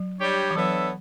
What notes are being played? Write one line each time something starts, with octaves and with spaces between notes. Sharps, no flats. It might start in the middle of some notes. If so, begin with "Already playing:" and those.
Already playing: F#3
G3 D4 G4 C#5
E3
F#3 B3 D4 A4 C#5 E5